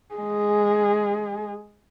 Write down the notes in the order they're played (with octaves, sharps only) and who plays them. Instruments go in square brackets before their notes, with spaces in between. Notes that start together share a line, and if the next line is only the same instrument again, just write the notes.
[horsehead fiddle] G#3 G#4